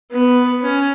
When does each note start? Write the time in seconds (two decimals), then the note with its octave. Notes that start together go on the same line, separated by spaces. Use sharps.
0.11 B3
0.63 C#4